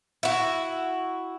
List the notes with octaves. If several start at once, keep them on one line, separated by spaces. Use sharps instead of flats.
E4 F#4